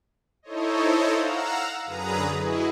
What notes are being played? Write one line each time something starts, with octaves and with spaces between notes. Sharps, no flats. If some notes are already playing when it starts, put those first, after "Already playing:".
D#4 E4 A4 C5 C#5 D#5
F5 F#5 A#5 E6
F#2 D3 G#4 B4 A#5 D#6
E4 F#4 G#4 B4 D#5